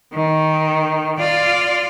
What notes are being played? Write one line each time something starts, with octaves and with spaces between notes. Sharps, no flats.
D#3
F4 D5